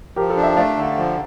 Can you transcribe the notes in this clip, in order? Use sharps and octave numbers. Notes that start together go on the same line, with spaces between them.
F3 G4 A#4
A4
D4
E5 G5
A3 D5 F5
D3
F3